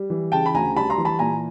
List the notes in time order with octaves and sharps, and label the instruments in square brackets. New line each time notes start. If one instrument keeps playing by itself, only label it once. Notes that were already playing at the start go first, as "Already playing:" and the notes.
Already playing: [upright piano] G3
E3
C#3 G5 A5
B5
D2 G#5 A#5
G3 A5 B5
A#5 C6
E3
A5 B5
A#2 G#5 A#5